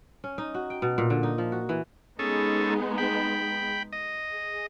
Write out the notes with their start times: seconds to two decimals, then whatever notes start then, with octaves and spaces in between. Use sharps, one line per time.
0.24 C#4
0.38 D#4
0.54 F#4
0.70 G5
0.82 B2
0.98 A#2
1.10 D3
1.23 D#4
1.38 F3
1.52 F#4
1.69 E3
2.19 G#3 B3 C#4 D#4 G#4 A4
2.98 G5 B5
3.93 D#5
4.32 G#4